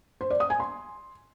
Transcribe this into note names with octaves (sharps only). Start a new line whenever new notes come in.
C5
D5
D#6
G#5
C6